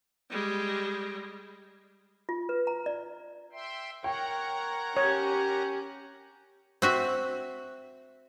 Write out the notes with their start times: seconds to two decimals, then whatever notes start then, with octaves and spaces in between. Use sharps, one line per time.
0.30 G3 G#3
2.29 F4
2.49 B4
2.67 A#5
2.86 D5
3.53 E5 G5 C6
4.04 A#4 C#5 F#5 G5 A#5
4.97 C#4 G4 C#5
6.82 C4 F#4 E5